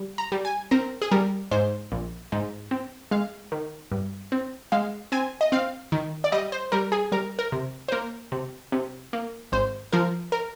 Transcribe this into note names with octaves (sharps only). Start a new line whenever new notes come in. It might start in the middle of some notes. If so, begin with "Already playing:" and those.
Already playing: G3
A#5
G3
G#5
C4 A#4
G#4
G3 A#4
G#2 C5
A#1
G#2
C4
G#3 F5
D#3
G2
C4
G#3 F5
C4 G#5
D#5
C4 F5
D#3
D5
G3 D#5
C5
G3 A#4
G#4
G3 A#4
A#4
C3
C5
A#3 A#4
C3
C3
A#3
G#1 C5
F3 A#4
A#4